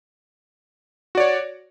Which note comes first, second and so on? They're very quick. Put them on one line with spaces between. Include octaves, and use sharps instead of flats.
F#4 D5 C#5